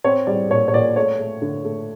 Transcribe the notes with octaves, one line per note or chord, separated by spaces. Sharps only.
C4 C#5
G3 D5
A#2 C#5
C#5
A#2 D5
A3 C#5
A3
D3
A3